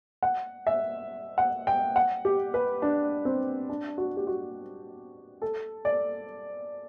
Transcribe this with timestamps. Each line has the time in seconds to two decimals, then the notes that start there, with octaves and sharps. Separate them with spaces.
0.23 F#5
0.67 E5
1.38 F#5
1.67 G5
1.96 F#5
2.25 G4
2.54 B4
2.82 D4
3.25 C4
3.69 D4
3.98 F#4
4.17 G4
4.27 F#4
5.42 A4
5.85 D5